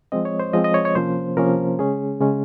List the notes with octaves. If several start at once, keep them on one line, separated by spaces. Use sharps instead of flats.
F3 G#3 C4 D#5
C#5
C5
F3 G#3 C4 D#5
D#5
C#5
C#5
C3 F3 A#3 C#4 C5
C3 F3 A#3 C#4 A#4
C#3 G#3 C#4 G#4
C#3 G#3 C#4